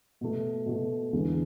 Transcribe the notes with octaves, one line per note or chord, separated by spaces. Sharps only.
B2 A3
B2 A3
E2 D3 G#3